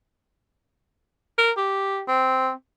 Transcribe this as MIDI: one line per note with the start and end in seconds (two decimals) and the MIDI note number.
1.38 1.51 70
1.57 2.02 67
2.08 2.51 60